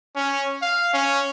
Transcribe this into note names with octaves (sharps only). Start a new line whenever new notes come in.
C#4
F5
C#4